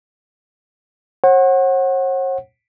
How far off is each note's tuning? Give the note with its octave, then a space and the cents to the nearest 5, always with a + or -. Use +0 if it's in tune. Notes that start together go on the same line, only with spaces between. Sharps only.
C#5 -45 F#5 +0